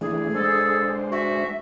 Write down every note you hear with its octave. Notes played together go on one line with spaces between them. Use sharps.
E3 A3 D4 G#4
G#3 D4 A4 C5
F#4 E5